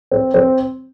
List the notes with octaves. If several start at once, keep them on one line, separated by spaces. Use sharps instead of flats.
C4
C4